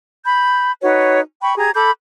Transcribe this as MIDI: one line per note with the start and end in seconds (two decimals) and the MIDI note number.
0.24 0.70 83
0.24 0.70 91
0.82 1.20 63
0.82 1.20 66
0.82 1.20 71
0.82 1.20 73
1.43 1.57 79
1.43 1.57 83
1.43 1.57 85
1.57 1.71 67
1.57 1.71 68
1.57 1.71 82
1.57 1.71 92
1.74 1.91 69
1.74 1.91 83
1.74 1.91 86
1.74 1.91 91